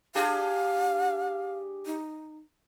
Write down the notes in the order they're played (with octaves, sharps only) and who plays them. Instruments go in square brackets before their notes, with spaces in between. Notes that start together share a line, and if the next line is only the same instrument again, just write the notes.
[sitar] D4 G4 G#4 [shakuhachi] F5
[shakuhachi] D#4